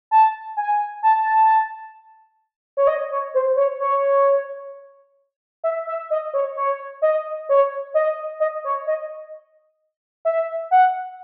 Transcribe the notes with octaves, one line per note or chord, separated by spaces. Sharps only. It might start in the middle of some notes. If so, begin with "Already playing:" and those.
A5
G#5
A5
C#5
D#5
C#5
C5
C#5
C#5
E5
E5
D#5
C#5
C#5
D#5
C#5
D#5
D#5
C#5
D#5
E5
F#5